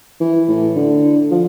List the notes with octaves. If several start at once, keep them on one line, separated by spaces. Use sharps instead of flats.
E3
A2
D3
F3